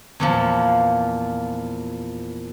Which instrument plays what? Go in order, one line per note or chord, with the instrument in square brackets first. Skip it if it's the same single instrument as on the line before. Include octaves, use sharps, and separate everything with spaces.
[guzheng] E2 A#2 F3